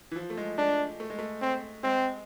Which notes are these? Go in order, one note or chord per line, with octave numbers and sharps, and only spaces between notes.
E3
F3
A3
G#3
G#3 D4
A3
G#3
A3
C4
G#3 C4